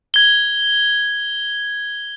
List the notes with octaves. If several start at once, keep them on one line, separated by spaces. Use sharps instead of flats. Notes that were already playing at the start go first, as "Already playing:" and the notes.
G#6 G7